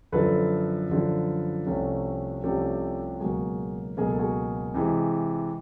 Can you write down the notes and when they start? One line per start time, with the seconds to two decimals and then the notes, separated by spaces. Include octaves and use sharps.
0.12 F#2 D3 F3 A4 B4
0.90 F#2 D3 F3
1.66 C2 C3 F3 A3 C#4
2.43 C2 C3 F3 A3 C#4 G4 A4
3.20 C#2 B2 F#3 A#3 F#4 G#4
3.97 C#2 B2 F#3 A#3 G#4
4.09 A4
4.19 F#4 G#4
4.74 C3 E3 G#3